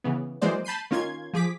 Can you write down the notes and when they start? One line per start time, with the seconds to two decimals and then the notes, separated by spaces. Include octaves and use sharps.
0.04 C#3 E3 B3
0.42 E3 F#3 G#3 A#3 C5 D5
0.65 A5 B5 G6 C7 D#7
0.91 D#3 A#3 C#4 F4 C6 G#6
1.33 F3 G#4 D6 B6